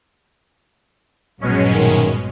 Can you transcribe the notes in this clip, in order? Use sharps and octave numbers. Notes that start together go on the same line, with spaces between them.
A#1 G2 B2 F#3 G#3 C#4
F#2 D#3